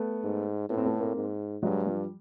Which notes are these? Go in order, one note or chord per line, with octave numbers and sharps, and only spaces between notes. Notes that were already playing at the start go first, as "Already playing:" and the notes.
Already playing: A3 B3
G#2
A2 B3
C4
A3 B3
A#3 C4
G#2
G2 F#3 G#3
F3 G3